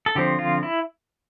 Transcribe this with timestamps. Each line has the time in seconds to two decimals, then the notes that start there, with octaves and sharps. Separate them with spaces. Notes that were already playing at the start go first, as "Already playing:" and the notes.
0.06 A4
0.15 D3 F3 C4 G4
0.39 F4
0.63 E4